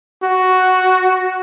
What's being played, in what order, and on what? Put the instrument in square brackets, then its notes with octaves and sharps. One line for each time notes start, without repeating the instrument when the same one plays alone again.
[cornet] F#4